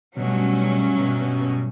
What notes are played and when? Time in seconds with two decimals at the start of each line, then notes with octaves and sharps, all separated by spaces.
0.16 G2 B2 F#3 A3 C#4
0.99 B2
1.20 B2
1.40 B2